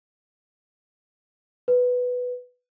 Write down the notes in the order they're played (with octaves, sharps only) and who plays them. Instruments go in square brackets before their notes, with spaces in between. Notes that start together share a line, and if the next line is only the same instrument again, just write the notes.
[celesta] B4